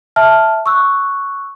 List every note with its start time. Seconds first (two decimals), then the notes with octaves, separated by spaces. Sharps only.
0.16 E5 A5 F6
0.66 C#6 E6 F#6